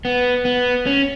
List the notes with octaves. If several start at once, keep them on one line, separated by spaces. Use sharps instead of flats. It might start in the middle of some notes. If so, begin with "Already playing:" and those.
B3
B3
C#4